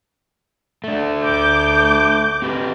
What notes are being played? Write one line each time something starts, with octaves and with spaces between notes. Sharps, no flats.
A3 D4
D2 D6 G6
C4 G4 B4